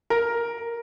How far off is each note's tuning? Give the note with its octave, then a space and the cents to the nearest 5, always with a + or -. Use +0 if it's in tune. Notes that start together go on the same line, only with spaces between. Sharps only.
A#4 +5